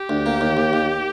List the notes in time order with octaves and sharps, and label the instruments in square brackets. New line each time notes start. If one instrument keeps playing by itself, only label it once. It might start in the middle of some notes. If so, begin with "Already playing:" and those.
Already playing: [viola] G4
[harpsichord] D2
A#3
D#2
D#2
D#2